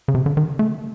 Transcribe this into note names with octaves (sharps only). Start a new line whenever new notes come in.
C#3
C3
D3
D#3
A3